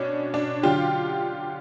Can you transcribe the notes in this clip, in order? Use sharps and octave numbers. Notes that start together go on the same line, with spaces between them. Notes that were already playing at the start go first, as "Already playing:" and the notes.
Already playing: B2 C#4 D4
D4
D3 F#3 F4 G4